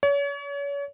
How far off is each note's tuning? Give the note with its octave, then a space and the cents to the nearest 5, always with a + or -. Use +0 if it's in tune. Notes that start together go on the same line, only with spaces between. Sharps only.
C#5 +35